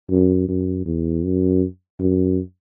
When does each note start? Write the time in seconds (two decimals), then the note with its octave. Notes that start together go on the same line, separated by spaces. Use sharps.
0.10 F#2
0.48 F#2
0.85 E2
1.24 F#2
2.00 F#2